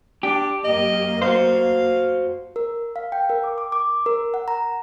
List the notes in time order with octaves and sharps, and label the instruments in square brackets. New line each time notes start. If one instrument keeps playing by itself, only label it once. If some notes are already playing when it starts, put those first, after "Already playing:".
[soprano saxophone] D4 [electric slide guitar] G4
[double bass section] F#2 A#3 [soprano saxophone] D#5
[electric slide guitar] F#4 C5 [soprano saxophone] F5
[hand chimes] A#4
F5
G5
A#4
D6
D6
D6
A#4
F#5
A#5